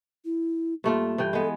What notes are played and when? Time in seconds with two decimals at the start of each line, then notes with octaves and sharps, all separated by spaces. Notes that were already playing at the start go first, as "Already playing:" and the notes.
0.25 E4
0.84 G2 A3 A#3 F4
1.18 G2 E3 G5
1.33 G#3 B3 A4